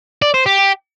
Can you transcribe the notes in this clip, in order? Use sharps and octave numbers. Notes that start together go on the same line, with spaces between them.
D5
C5
G4